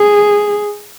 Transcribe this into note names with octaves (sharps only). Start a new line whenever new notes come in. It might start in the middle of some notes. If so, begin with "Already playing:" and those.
Already playing: G#4